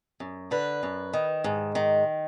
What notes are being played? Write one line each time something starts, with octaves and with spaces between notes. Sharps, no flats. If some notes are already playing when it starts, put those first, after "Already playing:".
F#2
D3 B4
F#2
D#3
G#2
D#3